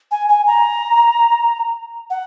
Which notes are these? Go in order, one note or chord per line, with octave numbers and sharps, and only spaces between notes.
G#5
G#5
A#5
F#5